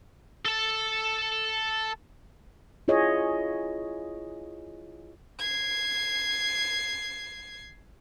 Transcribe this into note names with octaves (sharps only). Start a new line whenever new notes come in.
A4 A5
E4 F4 G#4 C#5 D#5
G#6 C7